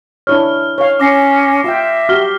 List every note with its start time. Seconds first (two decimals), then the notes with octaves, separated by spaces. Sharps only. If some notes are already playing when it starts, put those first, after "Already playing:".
0.27 D4 E4 C#5 F6
0.78 C#5 F5
1.00 C#4 D6 A#6 C7
1.64 F4 E5 G5
2.09 F#4 G4 F6 B6 G7